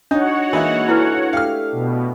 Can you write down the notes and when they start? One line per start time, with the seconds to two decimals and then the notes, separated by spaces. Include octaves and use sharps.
0.11 D4 D#4 F#4 C#5 F#5
0.53 E3 G#3 A#3 D#4 E5 F5
0.88 D4 E4 A4 B4
1.33 A3 G4 F5 F6
1.72 B2